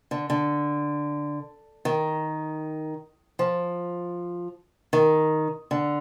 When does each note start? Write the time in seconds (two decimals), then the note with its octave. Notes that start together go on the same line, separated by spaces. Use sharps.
0.11 D3
0.30 D3
1.85 D#3
3.39 F3
4.93 D#3
5.71 D3